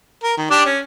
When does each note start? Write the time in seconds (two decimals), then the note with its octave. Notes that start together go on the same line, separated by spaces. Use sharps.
0.23 A#4
0.37 D#3
0.51 D4 G4 D5
0.65 C#4